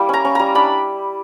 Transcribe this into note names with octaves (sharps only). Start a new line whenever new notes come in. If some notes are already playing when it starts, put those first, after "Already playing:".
Already playing: G3 A#3 E4
C#4 A#5
C#4
G3 A#5
D4 B5